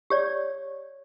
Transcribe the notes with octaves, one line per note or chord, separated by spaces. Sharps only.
G4 C#5 D5